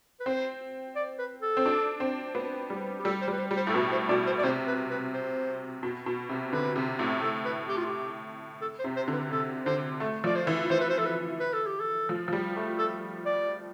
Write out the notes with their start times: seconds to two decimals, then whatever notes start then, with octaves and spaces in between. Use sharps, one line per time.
0.20 B4
0.26 C4 C5
0.96 D5
1.19 B4
1.42 A4
1.57 C4
1.66 D4
2.00 C4
2.35 B3
2.70 G3
2.99 G4
3.05 G3 A4
3.21 C5
3.28 G3
3.32 B4
3.39 C5
3.51 G3
3.56 C5
3.67 A2 A4
3.74 B2 B4
3.92 C5
4.09 B2 D5
4.26 C5
4.38 D5
4.43 C3 C5
4.67 B4
4.91 B4
5.14 C5
5.83 B2
6.06 B2
6.29 C3
6.53 D3 B4
6.76 C3
6.99 A2
7.22 A4
7.45 B4
7.69 G4
7.77 F4
7.86 G4
8.61 A4
8.79 C5
8.84 C3
8.96 C5
9.08 D3
9.13 B4
9.31 C3 A4
9.66 D3 C5
10.00 A3
10.24 F3 D5
10.36 C5
10.47 E3
10.70 E3 C5
10.80 B4
10.90 C5
10.98 A4
11.06 B4
11.40 B4
11.53 A4
11.66 G4
11.80 A4
12.09 F3
12.28 F3
12.33 G3
12.56 A3
12.79 A4
13.26 D5